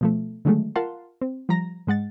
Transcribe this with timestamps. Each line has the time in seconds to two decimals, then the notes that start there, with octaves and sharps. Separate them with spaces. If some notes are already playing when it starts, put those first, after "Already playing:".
0.01 B2 F3 A3
0.45 D3 D#3 F#3 G#3 A3
0.76 F4 A#4 F5 F#5 A5 C6
1.21 C4
1.49 F3 G3 A#5 A#6
1.87 G#2 G#3 F#5 A6